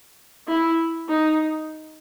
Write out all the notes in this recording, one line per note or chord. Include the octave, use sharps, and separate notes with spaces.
E4
D#4